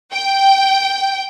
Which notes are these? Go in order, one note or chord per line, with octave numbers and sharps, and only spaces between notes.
G5